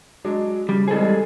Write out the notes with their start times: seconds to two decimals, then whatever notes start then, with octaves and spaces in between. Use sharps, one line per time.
0.24 F#3 G#3 D4
0.69 C#3 G3
0.88 E3 G3 G#3 C4 G#4 A4